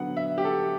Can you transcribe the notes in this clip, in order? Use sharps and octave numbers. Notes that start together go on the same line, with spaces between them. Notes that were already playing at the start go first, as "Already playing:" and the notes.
Already playing: D3 F#3 B3 F#5
E5
G4
A4